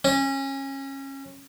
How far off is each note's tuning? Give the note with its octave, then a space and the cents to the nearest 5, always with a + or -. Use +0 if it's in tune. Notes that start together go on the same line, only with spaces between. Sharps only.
C#4 -25